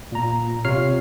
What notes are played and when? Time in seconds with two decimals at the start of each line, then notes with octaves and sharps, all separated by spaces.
0.12 A#2 A#5
0.65 C3 F4 C#5 F6 C7